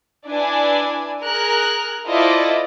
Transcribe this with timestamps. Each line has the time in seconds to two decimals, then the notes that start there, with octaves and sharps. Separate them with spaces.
0.27 D4 E4 B4 D5 G#5
1.23 G#4 A#4 F6 F#6
2.08 E4 F4 A4 C5 D5 D#5